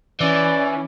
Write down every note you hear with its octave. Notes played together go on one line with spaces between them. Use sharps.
E3 C#4 D5